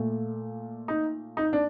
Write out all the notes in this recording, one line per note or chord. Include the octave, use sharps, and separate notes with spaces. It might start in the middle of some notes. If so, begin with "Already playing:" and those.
Already playing: A#2 A3
D#4
D#4
D4